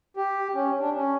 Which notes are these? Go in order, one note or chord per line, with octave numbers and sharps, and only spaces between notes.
G4
C#4
D4
C#4